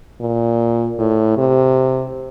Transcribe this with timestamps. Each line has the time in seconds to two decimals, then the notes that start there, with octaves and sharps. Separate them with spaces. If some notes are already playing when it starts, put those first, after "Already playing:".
0.21 A#2
0.99 A2
1.37 C3